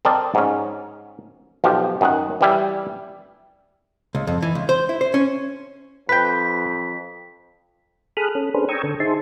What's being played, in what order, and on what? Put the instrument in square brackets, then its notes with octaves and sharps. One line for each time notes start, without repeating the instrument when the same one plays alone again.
[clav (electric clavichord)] C4 A4 A#4 D5 D#5 A5
G#2 C#4
B1 F3 G4
F#2 D#3 F#5
E3 G3 E4
[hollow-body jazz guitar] C#2
F2
E3
C#2
C5
E4
C5
C#4
[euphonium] F2 [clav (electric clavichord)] B4 G5 [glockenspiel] B6
[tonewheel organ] G#4 A4 B5 D#6 F6 F#6
C#4 A4
C#4 D4 G#4 A4 B4 C5
G5 A#5 C#6 D#6 E6 G#6
D3 A4
D#4 G#4 C5 E5 A5 C6